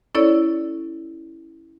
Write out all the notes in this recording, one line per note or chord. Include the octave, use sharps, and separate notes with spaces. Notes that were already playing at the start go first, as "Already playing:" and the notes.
C#4 E4 A4 C#5 D5